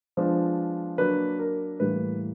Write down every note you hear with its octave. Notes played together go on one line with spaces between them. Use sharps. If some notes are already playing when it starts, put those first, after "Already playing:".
F3 G#3 B3 D4 C5
F#3 A#3 D4 B4
A#4
A2 E3 G3 A#3 B4